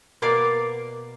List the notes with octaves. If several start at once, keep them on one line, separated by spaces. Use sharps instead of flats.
B2 A#3 D5 F5